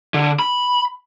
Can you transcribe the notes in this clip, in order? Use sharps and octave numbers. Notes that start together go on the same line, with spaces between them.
D3
B5